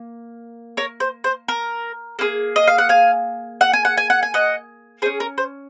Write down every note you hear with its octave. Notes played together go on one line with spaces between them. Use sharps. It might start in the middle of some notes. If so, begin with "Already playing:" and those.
Already playing: A#3
A#4 C#5
C5
C5
A#4
A#3 F4 G#4
D#5
F5
F#5
F5 G#5
F#5
G#5
F#5
G#5
F#5
G#5
D#5 F#5
C#4 G#4 C5
A#4
C5